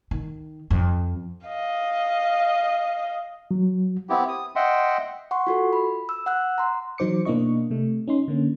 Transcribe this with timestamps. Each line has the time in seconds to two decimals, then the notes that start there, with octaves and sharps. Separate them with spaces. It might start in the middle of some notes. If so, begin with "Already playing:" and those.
0.11 D#3
0.70 F2
1.47 D#5 F5
3.51 F#3
4.09 B3 C4 E4 G4
4.28 D#6
4.56 D#5 E5 F#5 G5 C6
5.31 F#5 C6 C#6
5.47 F4 F#4 A4
5.73 B5
6.09 E6
6.26 F#5 E6 F#6
6.58 A#5 C6
6.98 E3 F#3 D#4 C5 D6 C#7
7.25 B2 A#3 D4 E4 D#5 C#6
7.71 C3 A3
8.08 C#4 D#4 C6
8.28 D3 A#3 C#4